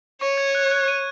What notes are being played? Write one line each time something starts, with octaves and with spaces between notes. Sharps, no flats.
C#5 C#6
G#6
F#6
F#6
D#7